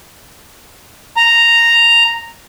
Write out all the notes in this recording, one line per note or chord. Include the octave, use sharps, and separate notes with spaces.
A#5